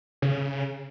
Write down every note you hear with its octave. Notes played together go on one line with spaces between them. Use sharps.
C#3